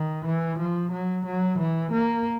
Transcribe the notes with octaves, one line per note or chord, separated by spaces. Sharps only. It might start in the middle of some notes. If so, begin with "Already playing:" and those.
Already playing: D#3
E3
F3
F#3
F#3
E3
A#3